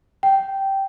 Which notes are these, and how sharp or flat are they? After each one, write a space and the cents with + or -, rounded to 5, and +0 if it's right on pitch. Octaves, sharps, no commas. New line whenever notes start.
G5 -10